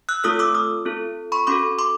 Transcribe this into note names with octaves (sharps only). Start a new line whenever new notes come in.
E6 F#6
A3 C4 F4 A4 D#6 F6
D6 E6
D#6 F6
C4 F4 A4
B5 C#6
C#4 F#4 A4 C6 D6
C6 D6